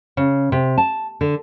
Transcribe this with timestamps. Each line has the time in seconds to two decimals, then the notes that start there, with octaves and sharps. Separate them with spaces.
0.17 C#3
0.52 C3
0.78 A5
1.21 D3